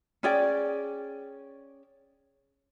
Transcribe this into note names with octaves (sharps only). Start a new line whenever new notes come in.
C#4 G#4 D5 G5